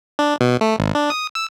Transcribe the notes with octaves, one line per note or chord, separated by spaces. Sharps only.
D4
B2
A3
G#1
D4
D#6
E6